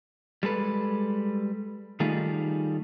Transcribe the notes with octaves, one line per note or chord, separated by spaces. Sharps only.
G3 G#3 A4 B4
D#3 G3 A3 D#4 F4 G#4